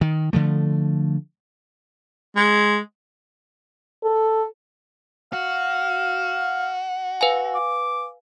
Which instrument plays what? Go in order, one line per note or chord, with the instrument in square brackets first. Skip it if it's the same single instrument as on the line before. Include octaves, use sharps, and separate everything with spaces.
[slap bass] D#3
D3 F3 A3
[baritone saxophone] G#3
[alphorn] A4
[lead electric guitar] F#4 [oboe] F5
[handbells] B4 F5 G#5
[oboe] D6